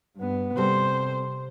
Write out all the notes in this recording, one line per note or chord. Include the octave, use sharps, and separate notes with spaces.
G2 B3
C3 G3 C4 A4 C5